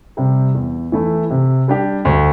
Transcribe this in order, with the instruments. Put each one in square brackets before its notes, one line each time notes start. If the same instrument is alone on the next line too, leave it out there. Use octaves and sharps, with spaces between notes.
[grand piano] C3 G3
E2
E3 A3 E4
C3
G3 D4 G4
D2